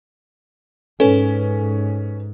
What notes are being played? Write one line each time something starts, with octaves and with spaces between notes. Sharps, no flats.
G#2 C#4 A4 B4